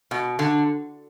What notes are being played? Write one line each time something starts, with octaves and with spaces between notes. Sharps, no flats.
B2
D3